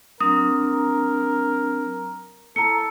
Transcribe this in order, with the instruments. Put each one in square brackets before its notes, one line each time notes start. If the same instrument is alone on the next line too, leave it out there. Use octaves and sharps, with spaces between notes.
[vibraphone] F#3 C4 D4 [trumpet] A#4 [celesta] D#6
[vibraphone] E4 [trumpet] A4 [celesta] A#5 C#7